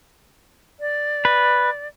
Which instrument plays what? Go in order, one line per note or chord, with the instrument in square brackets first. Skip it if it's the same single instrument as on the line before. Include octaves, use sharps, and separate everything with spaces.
[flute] D5
[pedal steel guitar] B4